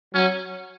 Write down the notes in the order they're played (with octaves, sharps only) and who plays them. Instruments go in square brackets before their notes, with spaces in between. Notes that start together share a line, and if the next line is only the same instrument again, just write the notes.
[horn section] F#3 [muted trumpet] C#4